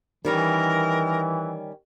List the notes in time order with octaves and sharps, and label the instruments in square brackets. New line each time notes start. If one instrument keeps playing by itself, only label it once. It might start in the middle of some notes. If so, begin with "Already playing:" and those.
[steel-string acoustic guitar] D#3 G3 C#4 [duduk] E3 [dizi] A#4